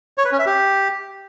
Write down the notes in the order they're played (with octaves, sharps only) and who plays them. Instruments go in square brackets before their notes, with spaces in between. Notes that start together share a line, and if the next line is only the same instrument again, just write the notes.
[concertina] C#5
B4
C#4
E5
G4